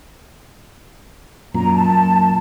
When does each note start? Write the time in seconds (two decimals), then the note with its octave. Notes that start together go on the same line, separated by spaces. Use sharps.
1.54 F#2 A#2 A#5
1.74 A5